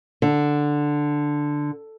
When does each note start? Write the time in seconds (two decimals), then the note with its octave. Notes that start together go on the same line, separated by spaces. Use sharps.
0.22 D3